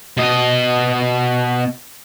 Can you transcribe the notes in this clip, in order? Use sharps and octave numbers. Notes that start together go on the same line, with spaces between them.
B2 D#5